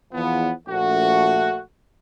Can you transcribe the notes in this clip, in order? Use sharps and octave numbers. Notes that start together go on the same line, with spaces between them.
E2 F3 B3
A#1 A3 F#4